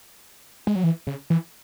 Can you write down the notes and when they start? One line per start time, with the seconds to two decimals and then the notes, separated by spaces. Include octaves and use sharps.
0.67 G#3
0.75 F#3
0.84 E3
1.07 C#3
1.30 E3